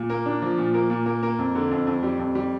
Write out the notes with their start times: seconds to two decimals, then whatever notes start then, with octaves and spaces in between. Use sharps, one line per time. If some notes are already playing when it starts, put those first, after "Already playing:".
Already playing: A#2
0.10 A#3
0.26 D4
0.42 F3
0.58 A#2
0.74 A#3
0.90 A#2
1.06 A#3
1.23 A#3
1.39 F2
1.55 D3
1.71 F2
1.87 F2
2.03 G3
2.19 F2
2.35 G3